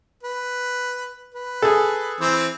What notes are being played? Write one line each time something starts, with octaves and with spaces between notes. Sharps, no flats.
B4
B4
G#4 A4
E3 C4 C5